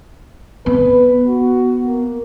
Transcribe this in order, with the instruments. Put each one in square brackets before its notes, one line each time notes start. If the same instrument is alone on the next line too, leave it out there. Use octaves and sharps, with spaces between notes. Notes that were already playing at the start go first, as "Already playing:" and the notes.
[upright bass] B3 [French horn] B4
[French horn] F#4
A#3